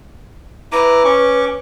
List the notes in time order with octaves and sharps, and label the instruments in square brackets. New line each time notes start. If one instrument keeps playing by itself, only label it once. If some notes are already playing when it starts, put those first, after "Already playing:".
[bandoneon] E4 A#5 D6 [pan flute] B4
[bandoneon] C#4 C#6 D6